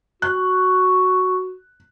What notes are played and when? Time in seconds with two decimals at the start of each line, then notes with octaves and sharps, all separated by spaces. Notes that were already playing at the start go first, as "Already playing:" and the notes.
0.22 F#4 F#6